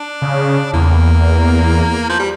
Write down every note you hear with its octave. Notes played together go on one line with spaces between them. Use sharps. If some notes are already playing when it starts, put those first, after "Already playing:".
Already playing: D4
C#3
E2 A#3
F3
G3